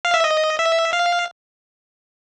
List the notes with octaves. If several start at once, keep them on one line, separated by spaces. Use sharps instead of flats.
F5
E5
D#5
E5
F5